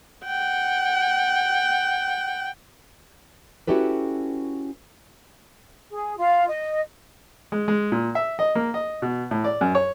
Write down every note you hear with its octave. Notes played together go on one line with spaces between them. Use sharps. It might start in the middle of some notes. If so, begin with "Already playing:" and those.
F#5 G5
C#4 E4 F#4 G4 A4 B4
G#4
F4 F5
D#5
G#3
G#3
A#2
E5
D#5
A#3
D#5
B2
A2
D5
F#2
C#5